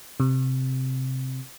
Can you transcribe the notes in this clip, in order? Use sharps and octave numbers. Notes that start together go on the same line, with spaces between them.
C3